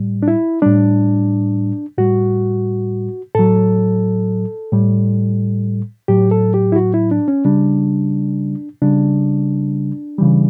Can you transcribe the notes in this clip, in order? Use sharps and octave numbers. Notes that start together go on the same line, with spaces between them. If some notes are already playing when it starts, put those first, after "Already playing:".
Already playing: A2 G3
D4
E4
A2 G3 D4
A2 G3 F#4
A2 F#3 A4
A2 G3
A2 F#3 G4
A4
G4
E4
F#4
E4
D4
C#4
C#3 G3 D4
C#3 G3 D4
C#3 E3 G3